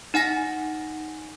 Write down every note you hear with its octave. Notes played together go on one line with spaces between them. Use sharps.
D#4 F#5 G#5 A#6